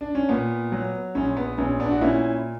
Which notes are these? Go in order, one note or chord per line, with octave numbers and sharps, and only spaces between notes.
D4
C#4
A#2 B3
F#3
A#1 C#4
B3
A#1 C#4
B3 D4
F#4
A#2 C#4 E4